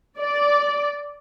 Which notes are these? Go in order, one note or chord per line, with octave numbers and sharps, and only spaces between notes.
D5